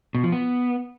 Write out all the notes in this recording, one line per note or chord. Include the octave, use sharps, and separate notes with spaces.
B2
F3
B3